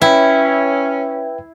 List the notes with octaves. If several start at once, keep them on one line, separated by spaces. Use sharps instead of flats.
C#4 E4 B4 E5 G5